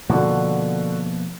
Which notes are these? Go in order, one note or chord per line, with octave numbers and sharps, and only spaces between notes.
B2 D3 F3 A#3 F#4